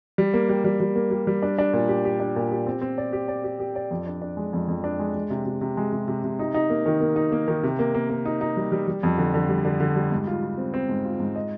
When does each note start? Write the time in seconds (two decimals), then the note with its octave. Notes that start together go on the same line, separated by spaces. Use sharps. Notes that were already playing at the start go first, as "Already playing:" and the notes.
0.18 G3
0.34 A#3
0.49 G3
0.65 G3
0.80 G3
0.96 A#3
1.11 G3
1.27 G3
1.42 D4
1.58 D4
1.73 A#2
1.89 G4
2.05 G4
2.20 D4
2.36 A#2
2.52 G4
2.67 C4
2.82 C4
2.98 D5
3.13 G4
3.28 D5
3.44 G4
3.60 G4
3.76 D5
3.91 F2
4.07 D4
4.22 D4
4.37 G#3
4.53 F2
4.68 F2
4.84 D4
4.99 G#3
5.14 G#3
5.30 C3
5.45 C3
5.61 C3
5.77 G#3
5.92 C3
6.08 C3
6.24 C3
6.39 D#4
6.54 D#4
6.70 A#3
6.86 D#3
7.01 A#3
7.16 D#4
7.32 A#3
7.48 D#3
7.63 C3
7.79 A#3
7.94 A#3
8.10 A#3
8.25 D#4
8.41 D#4
8.57 G3
8.72 G3
8.88 G3
9.03 F2
9.18 D3
9.34 D3
9.49 G3
9.65 D3
9.80 D3
9.96 G3
10.12 G#2
10.27 F4
10.43 F4
10.58 C4
10.74 C4
10.89 G#2
11.05 F4
11.20 G#2
11.36 D#5